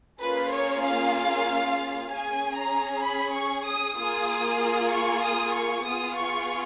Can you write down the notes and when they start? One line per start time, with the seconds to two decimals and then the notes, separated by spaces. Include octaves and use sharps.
0.21 A#3 C#4 F4 G#4 B4
0.52 C#5
0.84 F5
2.09 C#4 G#4 G#5
2.57 A#5
3.03 B5
3.35 C#6
3.67 D#6
3.97 A#3 F4 G#4 D#6
4.92 C#6
5.24 D#6
5.55 C#6
5.86 B3 F4 G#4 D#6
6.18 C#6